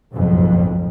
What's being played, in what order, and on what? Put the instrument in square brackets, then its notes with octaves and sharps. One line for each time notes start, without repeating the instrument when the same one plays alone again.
[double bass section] F#1 B1 F2 G#2